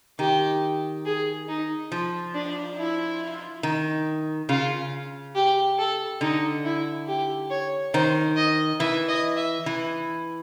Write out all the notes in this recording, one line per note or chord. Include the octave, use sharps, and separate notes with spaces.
D#3 G4
G#4
D#4
F3
D4
E4
D#3
C#3 F4
G4
A4
D3 D#4
E4
G4
C#5
D#3 C5
D#5
E3 E5
D#5
E5
E3